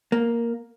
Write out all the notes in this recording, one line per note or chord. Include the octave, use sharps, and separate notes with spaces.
A#3